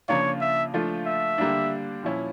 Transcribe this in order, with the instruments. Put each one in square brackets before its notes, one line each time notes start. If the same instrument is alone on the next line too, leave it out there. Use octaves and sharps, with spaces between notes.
[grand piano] C#3 F3 A#3 D4 F4 [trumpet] C#5
[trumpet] E5
[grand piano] F3 A3 D4 F4
[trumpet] E5
[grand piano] D3 G3 A#3 D4
A#2 F3 C#4 E4